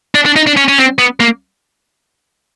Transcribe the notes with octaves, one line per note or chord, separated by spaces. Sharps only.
D4
D4
D#4
D4
C#4
C#4
C4
B3
A#3